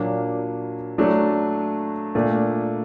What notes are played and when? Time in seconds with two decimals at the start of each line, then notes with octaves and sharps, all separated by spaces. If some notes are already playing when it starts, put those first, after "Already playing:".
Already playing: A#2 F#3 A#3 D4
0.98 F#3 A3 D4 F#4
2.15 A#2 A3 D4